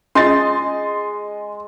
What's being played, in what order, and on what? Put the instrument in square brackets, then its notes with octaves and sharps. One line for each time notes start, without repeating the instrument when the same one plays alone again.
[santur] G#3 [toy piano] C#4 F4 [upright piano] D#5 A6 [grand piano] C6